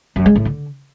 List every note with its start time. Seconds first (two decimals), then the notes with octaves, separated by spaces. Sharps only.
0.16 F#2
0.26 G#3
0.35 A2
0.45 D3